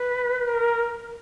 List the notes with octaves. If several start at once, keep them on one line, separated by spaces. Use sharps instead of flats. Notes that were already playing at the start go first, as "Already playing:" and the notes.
Already playing: B4
A#4